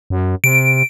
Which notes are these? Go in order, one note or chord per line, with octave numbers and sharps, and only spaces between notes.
F#2
C3 D7